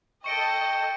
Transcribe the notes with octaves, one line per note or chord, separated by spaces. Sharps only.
A4 D#5 G5 C#6 C#7 D7